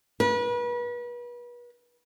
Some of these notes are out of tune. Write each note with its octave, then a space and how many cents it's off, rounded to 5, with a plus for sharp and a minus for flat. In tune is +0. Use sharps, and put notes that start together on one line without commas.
B4 -35